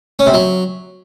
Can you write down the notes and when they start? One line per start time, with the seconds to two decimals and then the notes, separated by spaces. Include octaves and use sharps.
0.19 C#4
0.27 C3
0.34 F#3